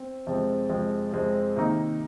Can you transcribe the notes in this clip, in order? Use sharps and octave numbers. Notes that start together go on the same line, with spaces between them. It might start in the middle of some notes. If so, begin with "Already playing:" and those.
Already playing: C4
F2 C3 F3 G#3 C4
F2 C3 F3 G#3 C4
F2 C3 F3 G#3 C4
C3 D#3 A#3 D#4